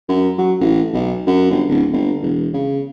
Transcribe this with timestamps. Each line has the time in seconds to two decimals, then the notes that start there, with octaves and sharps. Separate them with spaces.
0.09 F#2
0.38 F#3
0.60 A1
0.93 B1
1.27 F#2
1.51 G1
1.69 D1
1.93 G1
2.22 E1
2.53 C#3